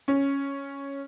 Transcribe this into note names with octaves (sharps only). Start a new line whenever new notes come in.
C#4